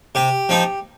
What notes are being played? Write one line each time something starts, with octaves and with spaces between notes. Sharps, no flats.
C3 G4
F3 C4 D#4